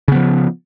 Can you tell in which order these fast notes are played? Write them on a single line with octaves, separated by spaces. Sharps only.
C#3 B3 F3